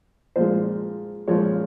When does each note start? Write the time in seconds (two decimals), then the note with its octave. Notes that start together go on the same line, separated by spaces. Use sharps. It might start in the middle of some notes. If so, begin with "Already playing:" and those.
0.36 A#2 F3 G#3 C5
1.28 A#2 F3 G#3 C#5